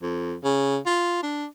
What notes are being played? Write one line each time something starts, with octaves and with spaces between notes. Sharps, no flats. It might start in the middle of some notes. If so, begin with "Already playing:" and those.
F2
C#3
F4
D4